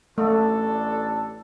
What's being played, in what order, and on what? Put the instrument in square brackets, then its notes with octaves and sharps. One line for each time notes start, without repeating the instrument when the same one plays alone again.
[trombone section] A1 D4 A4 [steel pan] A3